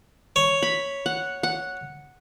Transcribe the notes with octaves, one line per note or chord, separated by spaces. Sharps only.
C#5
B5
F#5
F#5